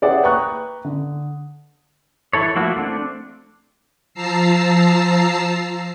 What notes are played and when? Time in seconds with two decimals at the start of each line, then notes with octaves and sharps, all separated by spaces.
0.02 G#4 B4 D5 E5 F#5 G5
0.23 B4 G5 A#5 C#6 D#6 F#6
0.85 D3
2.33 E3 E4 A4 C#5
2.55 F3 A3 A#3 E4 F#4
2.76 A3 C4 D4
4.14 F3 A5 A#5 E6 C7